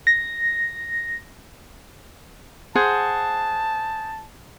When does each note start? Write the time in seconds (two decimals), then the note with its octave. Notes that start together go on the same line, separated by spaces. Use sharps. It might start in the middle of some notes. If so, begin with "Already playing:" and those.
0.07 A#6
2.76 G#4 C5 F#5 A5